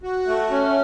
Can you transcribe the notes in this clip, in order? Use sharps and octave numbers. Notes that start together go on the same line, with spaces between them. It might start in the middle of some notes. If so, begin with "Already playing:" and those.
F#4
A3
C#4